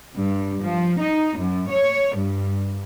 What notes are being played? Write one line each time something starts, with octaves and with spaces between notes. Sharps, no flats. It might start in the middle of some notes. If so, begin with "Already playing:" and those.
G2
F3
D#4
F#2
C#5
G2